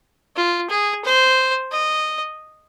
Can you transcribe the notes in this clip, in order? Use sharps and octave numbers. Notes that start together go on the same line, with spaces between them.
F4
G#4
C5
D#5